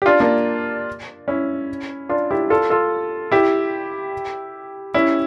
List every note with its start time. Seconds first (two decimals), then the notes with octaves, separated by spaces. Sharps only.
0.02 G4
0.06 D4 F4
0.20 A#3 D4
1.28 C#4 E4
2.09 D4 F4
2.31 E4 G4
2.50 F4 A4
2.70 F4 A4
3.32 E4 G4
4.94 C#4 E4